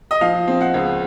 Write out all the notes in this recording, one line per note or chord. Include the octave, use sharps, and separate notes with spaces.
D#5
F3 F5
C4
F#5
C#2